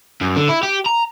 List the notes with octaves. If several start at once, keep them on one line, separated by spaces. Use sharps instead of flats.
F#2
D3
E4
G4
A#5